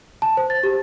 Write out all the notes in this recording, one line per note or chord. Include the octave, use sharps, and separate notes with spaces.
A5
C5
A6
G4